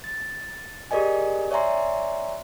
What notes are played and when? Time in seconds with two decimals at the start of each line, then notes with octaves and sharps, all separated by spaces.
0.04 A6
0.91 G4 G#4 A#4 D5 D#5 G#5
1.51 C#5 D5 E5 G#5 A#5 C6